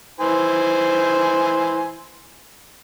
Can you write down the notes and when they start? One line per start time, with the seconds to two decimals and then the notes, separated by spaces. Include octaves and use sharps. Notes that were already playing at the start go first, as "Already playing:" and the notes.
0.20 E3 C5 G#5